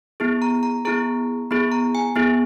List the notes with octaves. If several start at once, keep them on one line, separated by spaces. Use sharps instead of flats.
B3 E4 G#4
A#5
A#5
B3 E4 G#4 A#5
B3 E4 G#4 B5
A#5
G#5
B3 E4 G#4